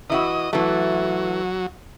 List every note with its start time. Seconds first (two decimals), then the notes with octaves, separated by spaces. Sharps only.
0.10 E3 E4 F#4 D#5
0.53 E3 F#3 A3